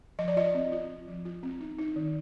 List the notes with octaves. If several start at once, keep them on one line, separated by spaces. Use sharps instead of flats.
F3 D#5
D5
F4 D#5
C4
F4
C4
F3
F4
C4
D#4
D#4
D#3